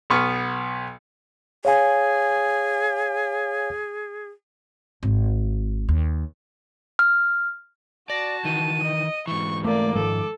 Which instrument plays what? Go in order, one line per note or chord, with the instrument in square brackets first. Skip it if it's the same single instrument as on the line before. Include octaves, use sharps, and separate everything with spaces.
[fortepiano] B1 B3 C#6 F6
[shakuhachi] G#4 [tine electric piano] C#5 F5 G#5
[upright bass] G#1
D#2
[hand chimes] F6
[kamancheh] F#4 A5 [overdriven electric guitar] D5 [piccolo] A#6
[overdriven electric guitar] D#3 E3 [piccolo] D#7
[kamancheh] D#5
[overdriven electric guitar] G#2 E3 [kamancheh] C#6
[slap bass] A3 [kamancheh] A#3 D5 [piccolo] D6
[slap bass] G#2 D#3 F3 [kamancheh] A4